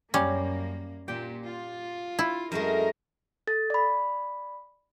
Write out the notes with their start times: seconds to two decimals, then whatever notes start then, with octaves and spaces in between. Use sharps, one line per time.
0.14 F#2 G3 A#3 C#4
1.08 A#2 G4 G5
1.46 F4
2.19 E4
2.52 F#2 G#3 A3 A#4 D#5
3.47 A4 A6
3.70 D5 B5